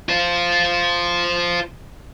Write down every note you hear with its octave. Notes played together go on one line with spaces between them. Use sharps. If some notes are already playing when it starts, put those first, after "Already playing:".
F4 C5